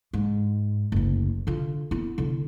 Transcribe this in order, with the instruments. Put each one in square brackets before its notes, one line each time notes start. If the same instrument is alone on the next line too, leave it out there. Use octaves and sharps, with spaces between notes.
[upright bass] G#2
F#1 D2
D3 F4
B3 E4
D3 E4